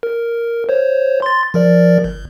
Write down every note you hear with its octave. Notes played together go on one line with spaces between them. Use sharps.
A#4
C5 C#5
C6 A6
F3 A#4 D5
G1